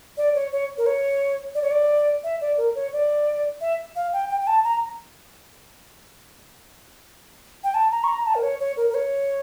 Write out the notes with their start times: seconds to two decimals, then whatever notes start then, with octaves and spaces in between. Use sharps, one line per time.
0.17 D5
0.35 C#5
0.52 C#5
0.78 A#4
0.86 C#5
1.55 D5
1.62 C#5
1.71 D5
2.24 E5
2.41 D5
2.58 A#4
2.75 C#5
2.93 D5
3.61 E5
3.96 F5
4.13 G5
4.30 G5
4.41 G5
4.47 A5
4.64 A#5
7.64 G5
7.74 A5
7.91 A#5
8.04 C#6
8.08 A#5
8.26 A5
8.35 A#4
8.43 C#5
8.60 C#5
8.77 A#4
8.90 A#4
8.94 C#5